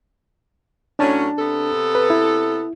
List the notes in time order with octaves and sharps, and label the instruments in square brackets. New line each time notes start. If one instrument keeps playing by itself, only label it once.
[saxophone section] A2 F#3 C#4 [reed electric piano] D4 A5
[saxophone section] C3 B3 A4
[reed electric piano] B4
E4